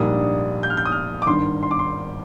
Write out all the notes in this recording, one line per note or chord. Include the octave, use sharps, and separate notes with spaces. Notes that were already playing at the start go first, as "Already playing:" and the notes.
Already playing: A#1 G#2 G3 A#3 D4 D#6
G6
F6
G6
D#6
F6
D6
G#1 G2 D#3 C6
C6
D6
C6